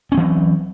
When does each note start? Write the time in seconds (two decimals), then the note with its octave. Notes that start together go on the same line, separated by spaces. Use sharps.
0.12 C#4
0.15 C4
0.17 E3
0.20 F#3